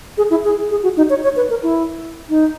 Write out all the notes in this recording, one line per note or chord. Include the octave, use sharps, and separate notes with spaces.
G#4
E4
G#4
G#4
F#4
D#4
C#5
C#5
B4
A#4
E4
D#4